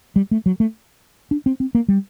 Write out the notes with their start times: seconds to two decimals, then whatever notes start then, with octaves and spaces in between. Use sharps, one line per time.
0.16 G3
0.31 A3
0.46 F#3
0.60 A3
1.31 D4
1.46 C4
1.60 C4
1.75 A#3
1.88 G3